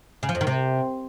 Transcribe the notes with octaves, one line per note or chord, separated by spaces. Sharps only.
C#3
F3
F2
D#3
C3